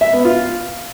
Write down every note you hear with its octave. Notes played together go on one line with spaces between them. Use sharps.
E5
B3
F4
F5